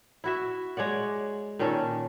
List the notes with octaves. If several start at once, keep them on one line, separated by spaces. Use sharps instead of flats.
E4 F#4 E5
G#3 C#5 D5 F#5
A#2 D#3 C#4 A4